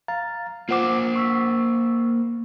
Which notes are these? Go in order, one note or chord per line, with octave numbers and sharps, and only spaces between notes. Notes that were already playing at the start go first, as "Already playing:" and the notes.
F5 A#5 A6
A#3 F4 C5 F#5 D6
C#6 E6 B6